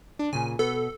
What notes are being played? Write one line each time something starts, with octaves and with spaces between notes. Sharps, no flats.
D4
A#2 C#3 G#5
B2 B3 A4